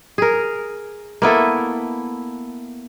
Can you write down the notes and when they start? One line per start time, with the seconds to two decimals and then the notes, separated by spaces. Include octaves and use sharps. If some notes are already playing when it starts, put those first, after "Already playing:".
0.18 G#4 A#4
1.22 A#3 B3 E4 A4